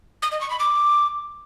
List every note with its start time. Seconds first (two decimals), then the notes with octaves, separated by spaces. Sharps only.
0.22 D#6
0.32 D#5
0.41 C#6
0.50 B5
0.59 D6